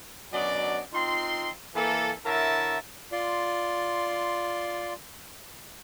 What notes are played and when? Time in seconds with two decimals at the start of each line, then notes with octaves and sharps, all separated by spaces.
0.32 F#2 B2 F#3 D4 D5 D#5
0.93 C4 D#4 F4 C6
1.75 E3 A#3 A4
2.25 D3 E4 A#4 C#5 E5 A5
3.12 F4 D5 C6